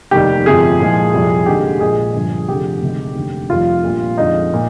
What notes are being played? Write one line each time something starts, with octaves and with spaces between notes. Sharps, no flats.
F1 D#2 D#3 G3 G4
G1 F2 C3 F3 G#4
C2 A#2 F3 G#3
F2 C3 G3
D#2 D3 G#3 G4
A#1 A#2 G#3 G#4
G1 G2 F3
F1 F2 D3 G4
D2 C3 D#3 G#3
F1 D#2 D3
F1 F2 D#3 G3 F4
A#1 A#2 G3
F2 D3 G#3 D#4
A#2